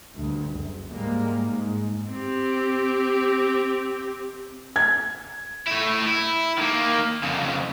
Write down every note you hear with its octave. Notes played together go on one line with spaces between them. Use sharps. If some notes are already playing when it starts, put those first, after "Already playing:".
D2 G2
F#1
G#2 G3 G#3 A#3
G#2
C4 G4
G#6
A3 E4
E4
D#3 A#3
F2 C#3